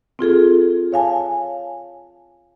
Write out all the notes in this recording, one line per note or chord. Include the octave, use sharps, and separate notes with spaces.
C4 F4 G#4 A4
C#5 F5 G#5 A5